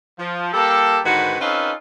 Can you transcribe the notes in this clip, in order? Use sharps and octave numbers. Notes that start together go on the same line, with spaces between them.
F3
G3 A#3 G4 A4
G#2 D3 D#3 F#4 B4
C4 C#4 D#4 F4 A4 B4